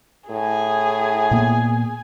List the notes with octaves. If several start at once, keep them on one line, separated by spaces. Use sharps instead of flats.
A2 G#4 G#5
A#2 A#3 B3